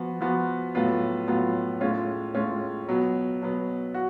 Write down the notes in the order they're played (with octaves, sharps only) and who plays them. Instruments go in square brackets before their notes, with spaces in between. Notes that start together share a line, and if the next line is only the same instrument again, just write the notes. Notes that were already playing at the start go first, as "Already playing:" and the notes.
Already playing: [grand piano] F3 B3 F#4
F3 B3 F#4
A2 F#3 B3 F4
A2 F#3 B3 F4
A2 G#3 C#4 F4
A2 G#3 C#4 F4
B2 F#3 B3
B2 F#3 B3
F#4